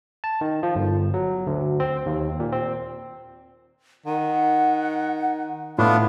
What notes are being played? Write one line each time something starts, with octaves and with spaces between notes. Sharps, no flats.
A5
D#3
F3
G1
F#3
D2
C4
D#2
A#2
C4
D#3 F#5
A2 B3 D4 F4